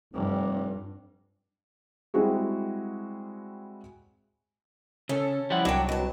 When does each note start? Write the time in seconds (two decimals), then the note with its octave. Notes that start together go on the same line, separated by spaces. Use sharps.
0.14 F1 G2
2.14 G3 G#3 C4 E4 F#4 G#4
5.09 C#3 C#4 A4
5.50 F3 G3 E4 F#5
5.65 C2 F#3 D4 F#4 G5
5.89 B2 A5